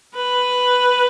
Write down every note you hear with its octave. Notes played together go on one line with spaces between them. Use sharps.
B4